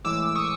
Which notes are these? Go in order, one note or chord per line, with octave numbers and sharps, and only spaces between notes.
A2 E3 G#3 D6 E6
C#6 D#6